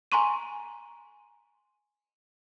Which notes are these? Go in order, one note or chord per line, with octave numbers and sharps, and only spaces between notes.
G#5 A#5 C6 C#6 D#7